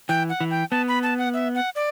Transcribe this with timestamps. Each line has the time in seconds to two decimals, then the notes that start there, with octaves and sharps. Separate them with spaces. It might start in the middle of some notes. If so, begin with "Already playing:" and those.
0.09 E3 G5
0.29 F#5
0.40 E3
0.51 G5
0.71 B3 A5
0.88 B5
1.03 A5
1.18 F#5
1.34 E5
1.55 F#5
1.75 D5